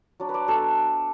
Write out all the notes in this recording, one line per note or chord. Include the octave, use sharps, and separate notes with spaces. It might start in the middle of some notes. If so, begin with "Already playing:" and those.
F#3 D4
B4
D5
F#3 B3 D4 A4